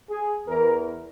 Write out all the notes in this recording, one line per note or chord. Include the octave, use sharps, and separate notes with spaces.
G#4
E2 E3 A#4